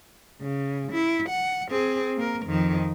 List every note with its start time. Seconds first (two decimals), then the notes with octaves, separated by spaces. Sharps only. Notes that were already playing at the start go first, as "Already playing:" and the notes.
0.41 C#3
0.92 E4
1.29 F#5
1.71 C4 G#4
2.17 A#3 A#4
2.46 F2 D#3